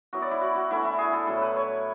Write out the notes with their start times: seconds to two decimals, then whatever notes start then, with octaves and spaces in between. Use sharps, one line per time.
0.13 F#3 B3 E4 F#4
0.22 D5
0.31 E4
0.41 F#4
0.55 F#4
0.70 E3 A3 D4 E4
0.85 E4
0.99 G#4
1.13 A4
1.27 A2 F#3 B3 E4 A4
1.42 B4
1.57 C#5